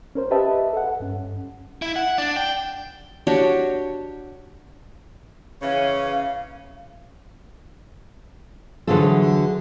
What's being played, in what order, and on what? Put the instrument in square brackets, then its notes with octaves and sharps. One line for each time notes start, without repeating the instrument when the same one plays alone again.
[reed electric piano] C#4 A#4 C5
G4 B4 D#5 E5 A5
A4 F#5
G2 C#4
[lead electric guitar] E4
F#5
D4
G5
[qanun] D4 F#4 G4 C#5
[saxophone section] C#3 E3 C#4 [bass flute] F5
[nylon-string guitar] D3 E3 F#3 F4 G#4 A4